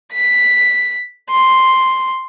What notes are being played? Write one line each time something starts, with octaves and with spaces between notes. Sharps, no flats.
B6
C6